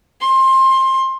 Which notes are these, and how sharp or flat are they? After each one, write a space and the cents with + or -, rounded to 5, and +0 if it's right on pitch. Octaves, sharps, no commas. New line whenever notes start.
C6 +20